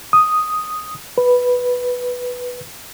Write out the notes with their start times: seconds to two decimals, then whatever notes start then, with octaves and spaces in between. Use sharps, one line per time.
0.13 D#6
1.18 B4